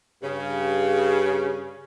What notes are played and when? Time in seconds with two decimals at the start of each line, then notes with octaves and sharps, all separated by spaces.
0.22 G2 C#3